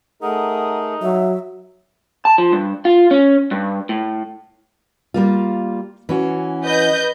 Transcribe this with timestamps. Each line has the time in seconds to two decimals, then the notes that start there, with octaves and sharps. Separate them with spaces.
0.22 A3 D#4 G#4 A#4 F#5
1.02 F#3 E5
2.25 A5
2.38 F3
2.52 G2
2.85 F4
3.11 C#4
3.51 G2
3.89 A2
5.14 G3 A#3 F4
6.09 E3 C#4 F#4
6.63 B4 D#5 G6